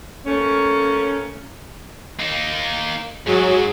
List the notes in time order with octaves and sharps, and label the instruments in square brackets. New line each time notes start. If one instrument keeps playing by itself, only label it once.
[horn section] A3 A#3 C#4
[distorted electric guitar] A#3 D#4
[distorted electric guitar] G#2 [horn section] F#3 [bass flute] G#4